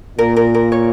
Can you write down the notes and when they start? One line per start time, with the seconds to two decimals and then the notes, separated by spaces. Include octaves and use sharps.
0.18 A#2 A#4
0.37 A#4
0.55 A#4
0.72 C#5